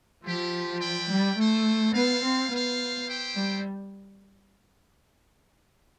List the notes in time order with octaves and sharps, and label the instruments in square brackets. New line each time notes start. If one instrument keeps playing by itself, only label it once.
[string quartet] F3 [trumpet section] A3 E4 G4
[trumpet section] E4 B4 D5 G5
[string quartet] G3
[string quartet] A3 [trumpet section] E4 A4 C5
[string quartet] B3 [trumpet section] E4 A4 C5 F5
[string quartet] C4
[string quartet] B3 [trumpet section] F4 C5 F5
[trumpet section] E4 G4 C5 G5
[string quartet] G3